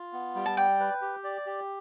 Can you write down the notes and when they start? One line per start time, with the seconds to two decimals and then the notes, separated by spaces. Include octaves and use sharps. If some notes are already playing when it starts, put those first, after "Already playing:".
Already playing: F4
0.12 B3
0.35 G3
0.46 A5
0.57 D5 G5
0.80 B4
1.01 G4
1.24 D5
1.46 G4